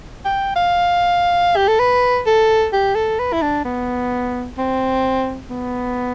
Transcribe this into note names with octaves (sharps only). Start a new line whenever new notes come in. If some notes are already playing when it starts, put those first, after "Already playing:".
G5
F5
G4
A4
B4
A4
G4
A4
B4
E4
D4
B3
C4
B3